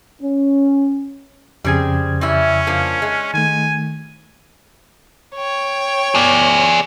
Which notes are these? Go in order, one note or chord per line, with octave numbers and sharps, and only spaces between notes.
C#4
F2 C#3 G3 C4 G#4 G#6
E3 G3 C#4 E4
F3 A#3 D4
G#3
D#3 A3 G#5
C#5 G5
G#4 D5